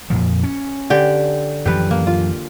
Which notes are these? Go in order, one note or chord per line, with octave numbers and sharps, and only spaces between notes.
F2 A#2 F3
C#4
D3 G4
F#2 E3 F3 G4 B4
A#3
F4